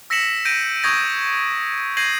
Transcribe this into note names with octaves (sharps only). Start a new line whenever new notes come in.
E6 A#6 B6 C#7 E7 F#7
G6 A#6 D7 D#7
C#6 D#6 G6 G#6 A#6
G6 G#6 A#6 C7 D#7 F#7